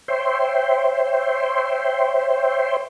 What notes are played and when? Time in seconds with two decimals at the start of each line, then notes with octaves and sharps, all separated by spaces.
0.08 C5 C#5 E5 G5 C6